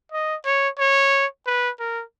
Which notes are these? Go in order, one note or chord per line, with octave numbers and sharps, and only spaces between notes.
D#5
C#5
C#5
B4
A#4